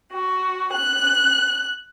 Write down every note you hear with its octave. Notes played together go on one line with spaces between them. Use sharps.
F#4
F#6